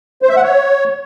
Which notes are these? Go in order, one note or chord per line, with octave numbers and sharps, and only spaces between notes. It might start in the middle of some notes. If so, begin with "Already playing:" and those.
C5
E5
F#5
C#5